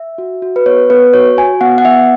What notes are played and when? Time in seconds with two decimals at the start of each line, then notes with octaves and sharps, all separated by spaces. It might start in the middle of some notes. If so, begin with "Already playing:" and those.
Already playing: E5
0.18 F#4
0.42 F#4
0.56 B4
0.66 B3 C#5
0.90 B3 B4
1.13 F#4 C#5
1.37 F#4 G#5
1.61 B3 F#5
1.78 F#5
1.85 B3 E5